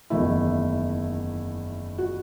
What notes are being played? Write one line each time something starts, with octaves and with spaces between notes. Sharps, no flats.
F#1 E2 D#3 A3 E4
F#4